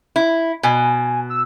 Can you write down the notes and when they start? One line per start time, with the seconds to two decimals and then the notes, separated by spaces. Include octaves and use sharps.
0.16 E4
0.63 B2 G#5
1.30 E6